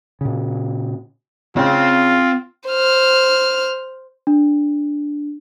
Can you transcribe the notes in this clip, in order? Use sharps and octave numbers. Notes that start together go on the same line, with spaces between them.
A#2 C#3
C#3 C4 F4 G5
C5 F6
D4